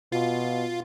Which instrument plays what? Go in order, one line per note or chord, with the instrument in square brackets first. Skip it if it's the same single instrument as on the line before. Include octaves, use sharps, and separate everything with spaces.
[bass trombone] B2 [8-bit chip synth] F4